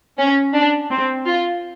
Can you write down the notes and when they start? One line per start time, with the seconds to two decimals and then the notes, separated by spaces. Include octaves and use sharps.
0.18 C#4
0.53 D4
0.90 C4
1.26 F4